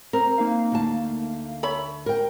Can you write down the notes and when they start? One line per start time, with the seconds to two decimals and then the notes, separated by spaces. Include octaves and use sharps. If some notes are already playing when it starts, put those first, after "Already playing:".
0.13 C4 A#4
0.38 A#3 D#4 F5
0.72 D2 A5
1.63 C#5 E5 B5
2.06 A#4 G5